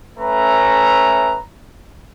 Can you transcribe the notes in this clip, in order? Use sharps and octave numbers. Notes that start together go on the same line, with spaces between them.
A3 C#4 B4 E5 A#5